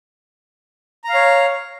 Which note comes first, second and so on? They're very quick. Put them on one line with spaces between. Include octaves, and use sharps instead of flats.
A#5 F5 C#5